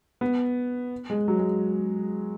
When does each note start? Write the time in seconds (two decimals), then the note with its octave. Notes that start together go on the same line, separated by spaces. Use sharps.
0.21 B3
1.10 G#3
1.28 F#3
1.39 G#3